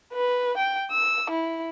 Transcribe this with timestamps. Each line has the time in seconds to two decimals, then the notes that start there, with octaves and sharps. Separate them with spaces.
0.14 B4
0.57 G5
0.91 E6
1.30 E4